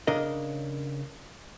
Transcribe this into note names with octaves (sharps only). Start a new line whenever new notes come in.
C#3 D4 A#4 D#5